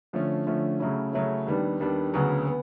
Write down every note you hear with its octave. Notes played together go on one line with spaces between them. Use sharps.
D3 F3 A3 C#4
D3 F3 A3 C#4
C#3 F#3 A3 C#4 E4
C#3 F#3 A3 C#4 E4
D#2 D#3 G3 B3 D4
D#2 D#3 G3 B3 D4
D2 C#3 F#3 B3
B3